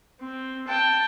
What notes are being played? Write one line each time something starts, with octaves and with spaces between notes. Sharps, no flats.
C4
G5 A5